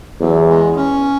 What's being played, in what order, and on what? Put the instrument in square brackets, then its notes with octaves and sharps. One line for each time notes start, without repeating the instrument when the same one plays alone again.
[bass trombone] E2 [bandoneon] F#3
[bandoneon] G#3
C#4